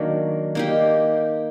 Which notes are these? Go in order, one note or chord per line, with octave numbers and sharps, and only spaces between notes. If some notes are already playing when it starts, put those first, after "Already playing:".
Already playing: D#3 F#3 A#3 D4
A#3 D#4 G4